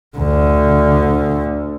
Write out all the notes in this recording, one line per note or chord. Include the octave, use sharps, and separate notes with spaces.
D2 D3